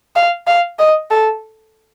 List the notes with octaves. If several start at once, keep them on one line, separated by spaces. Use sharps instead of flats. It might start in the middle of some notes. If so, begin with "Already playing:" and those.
F5
F5
D#5
A4